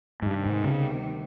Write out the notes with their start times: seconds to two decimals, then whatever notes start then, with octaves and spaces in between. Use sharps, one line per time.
0.22 G#2
0.26 D2 G2 C3 D#3 G3 B3
0.46 G#2
0.64 C#3